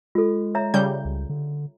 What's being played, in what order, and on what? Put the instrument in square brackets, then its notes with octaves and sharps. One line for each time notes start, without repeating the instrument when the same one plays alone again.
[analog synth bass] G#3 [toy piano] F4 A4
[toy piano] C#5 E5 A#5
[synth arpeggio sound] C#3 G3 G6
[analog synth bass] C#2
D3